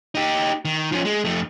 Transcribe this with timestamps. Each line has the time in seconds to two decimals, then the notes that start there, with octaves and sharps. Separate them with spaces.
0.15 D#4 G4
0.65 D#3
0.92 F3 C#4
1.05 G#3
1.25 F2 A3